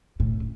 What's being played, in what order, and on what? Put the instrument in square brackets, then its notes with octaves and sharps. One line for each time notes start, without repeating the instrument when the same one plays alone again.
[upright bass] A2